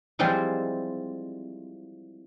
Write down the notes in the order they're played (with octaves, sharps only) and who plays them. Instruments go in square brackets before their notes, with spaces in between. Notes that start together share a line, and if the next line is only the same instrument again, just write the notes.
[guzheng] E3 F3 G3 G#3 C4